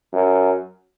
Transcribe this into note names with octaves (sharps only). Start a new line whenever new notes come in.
F#2